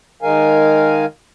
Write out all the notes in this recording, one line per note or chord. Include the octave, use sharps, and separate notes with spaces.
D#3 G#3 A#4 F5 G#5